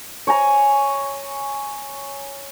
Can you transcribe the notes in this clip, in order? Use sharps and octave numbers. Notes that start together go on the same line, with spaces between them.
C#5 G#5 A#5